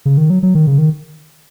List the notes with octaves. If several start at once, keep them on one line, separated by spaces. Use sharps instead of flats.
C#3
D#3
F#3
F#3
D#3
C#3
D#3